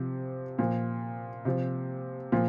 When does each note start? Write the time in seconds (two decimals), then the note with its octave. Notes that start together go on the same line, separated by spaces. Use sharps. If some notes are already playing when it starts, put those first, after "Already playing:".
Already playing: C3 F3
0.59 A#2 F3
1.45 C3 F3
2.32 A#2 F3